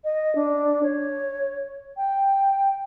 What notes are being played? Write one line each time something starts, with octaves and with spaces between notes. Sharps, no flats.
D#5
D4
C#5
G5